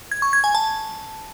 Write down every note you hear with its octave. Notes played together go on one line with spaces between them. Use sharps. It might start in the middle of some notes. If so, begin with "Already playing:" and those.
G#6
C#6
G#6
G#5
A5